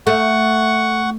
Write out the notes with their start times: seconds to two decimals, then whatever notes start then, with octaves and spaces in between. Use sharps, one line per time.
0.07 A3 F#5 C#6